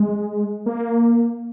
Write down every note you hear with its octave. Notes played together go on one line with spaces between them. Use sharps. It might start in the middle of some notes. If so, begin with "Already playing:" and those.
Already playing: G#3
A#3